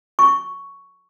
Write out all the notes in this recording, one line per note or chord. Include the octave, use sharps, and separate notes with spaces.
C#6